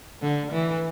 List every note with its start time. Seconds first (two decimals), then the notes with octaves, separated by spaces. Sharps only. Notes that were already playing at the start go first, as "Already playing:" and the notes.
0.22 D3
0.52 E3